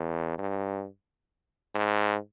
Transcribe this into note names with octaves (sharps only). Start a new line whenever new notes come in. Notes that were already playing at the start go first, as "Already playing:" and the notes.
Already playing: E2
G2
G#2